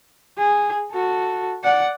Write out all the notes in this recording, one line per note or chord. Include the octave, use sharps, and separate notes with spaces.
G#4
F#4 A4
D5 F#5